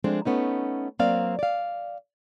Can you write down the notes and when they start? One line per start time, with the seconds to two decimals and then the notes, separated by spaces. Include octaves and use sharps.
0.04 F3 G#3 A3 C4 D4
0.25 A3 B3 C#4 D#4
0.99 F#3 A#3 C4 D5 F5
1.39 D5 F5